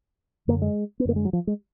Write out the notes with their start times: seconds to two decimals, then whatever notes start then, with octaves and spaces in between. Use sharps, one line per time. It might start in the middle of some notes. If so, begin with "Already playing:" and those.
0.48 F#2 D3 A#3
0.62 G#3
1.00 B3
1.05 F#2 D3 A#3
1.16 G#3
1.25 F#3
1.33 F3
1.47 G#3